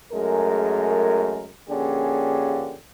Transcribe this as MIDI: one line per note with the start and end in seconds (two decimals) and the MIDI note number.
0.13 1.47 42
0.13 1.47 56
0.13 1.47 57
0.13 1.47 68
0.13 1.47 70
1.70 2.77 34
1.70 2.77 50
1.70 2.77 58
1.70 2.77 61
1.70 2.77 67
1.70 2.77 68